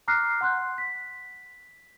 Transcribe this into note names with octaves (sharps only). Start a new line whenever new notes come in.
A#5 D6 F6 F#6 A#6 C7
F#5 C6 F#6 G6
B6